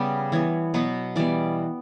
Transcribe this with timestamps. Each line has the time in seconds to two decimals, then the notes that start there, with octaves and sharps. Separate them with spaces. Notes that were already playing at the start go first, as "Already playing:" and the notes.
Already playing: C#3 G3 B3 G4
0.32 E3 B3 C#5
0.74 B2 F#3 B3 B4
1.16 E3 G3 B3 D5